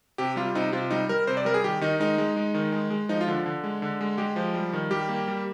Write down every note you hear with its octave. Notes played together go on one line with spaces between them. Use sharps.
C3 G4
G3 F4
C3 D#4
C3 F4
G3 D#4
G3 A#4
C3 C5
D5
G3 A#4
G#4
D#3 G4
D#3 D#4
G#3 D#4
G#3
G#3
D#3
G#3
G#3
F3 D#4
F4
D3
D4
D3
G#3
D3
G#3
G#3 G4
F3
G3
D#3
G3 G4
A#3
G3